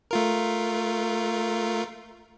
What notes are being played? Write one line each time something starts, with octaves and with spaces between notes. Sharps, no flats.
A3 F4 A#4